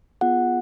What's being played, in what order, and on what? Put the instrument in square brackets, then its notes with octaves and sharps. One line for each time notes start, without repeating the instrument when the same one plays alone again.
[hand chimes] B3 F4 G#4 F#5